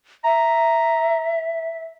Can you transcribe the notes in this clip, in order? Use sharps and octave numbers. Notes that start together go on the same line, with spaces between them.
E5 A#5